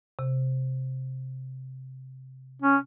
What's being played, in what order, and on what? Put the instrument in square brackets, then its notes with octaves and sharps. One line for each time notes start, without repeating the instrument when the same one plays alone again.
[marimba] C3
[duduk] C#4